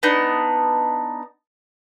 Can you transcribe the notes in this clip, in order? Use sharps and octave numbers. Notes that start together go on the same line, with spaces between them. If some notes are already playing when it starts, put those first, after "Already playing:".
B3 D4 D#4